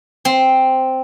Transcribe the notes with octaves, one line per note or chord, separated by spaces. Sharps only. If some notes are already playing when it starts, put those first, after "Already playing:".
C4